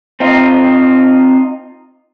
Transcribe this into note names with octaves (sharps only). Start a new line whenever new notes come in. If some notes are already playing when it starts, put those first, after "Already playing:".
C4 D#4 F4